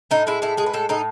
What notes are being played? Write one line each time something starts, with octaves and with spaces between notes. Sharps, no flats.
A2 D#4
G#3 E4
A2 E4
G#3 G#4
B4
A2 A4
A2 D#4